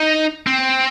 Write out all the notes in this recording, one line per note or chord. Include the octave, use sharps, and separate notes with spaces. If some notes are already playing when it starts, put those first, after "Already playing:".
Already playing: D#4
C4